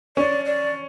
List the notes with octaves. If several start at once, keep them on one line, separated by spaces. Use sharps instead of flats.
C#4 D5
D5